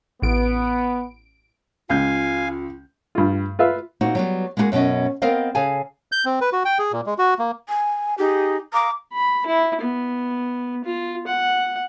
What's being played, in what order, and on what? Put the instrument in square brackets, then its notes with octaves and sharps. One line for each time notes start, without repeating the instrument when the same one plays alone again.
[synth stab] A1 D7 [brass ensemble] B3
[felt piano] C#2 G6 [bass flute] F4 [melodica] F5 G#5
[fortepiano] G2 F4
F4 B4 E5 F5
[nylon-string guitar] A#2 C4 D#4 F#4
F#3 G3 B3
G#3 A#3 C#4 E4 F#4 G#4
F#2 B2 B3 C#4 D#5
B3 C4 A#4 C5 D#5 F5
C#3 G#4 A4 F5 G#5
[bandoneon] G6
C4
B4
F#4
G5
G#4
A#2
G#3
F#4
A#3
[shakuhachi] G#5
[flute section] D#4 G#4 [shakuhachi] G4
[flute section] F5 D6 D#6 [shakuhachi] A#5
[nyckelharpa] B5
E4
B3
F4
F#5